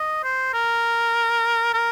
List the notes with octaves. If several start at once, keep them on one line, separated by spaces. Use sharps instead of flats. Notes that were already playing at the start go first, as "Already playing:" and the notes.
Already playing: D#5
C5
A#4
A#4